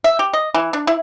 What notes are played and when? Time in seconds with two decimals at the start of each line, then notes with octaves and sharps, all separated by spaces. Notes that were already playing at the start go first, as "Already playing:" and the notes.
0.04 E5
0.19 G4
0.33 D#5
0.54 E3
0.73 D4
0.87 E4